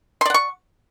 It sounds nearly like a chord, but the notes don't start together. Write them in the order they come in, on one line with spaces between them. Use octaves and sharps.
C6 D5 F#5 C#6